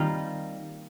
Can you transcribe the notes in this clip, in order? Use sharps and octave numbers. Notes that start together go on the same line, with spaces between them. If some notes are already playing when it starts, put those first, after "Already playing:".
Already playing: D#3 G3 A#3 C4 F4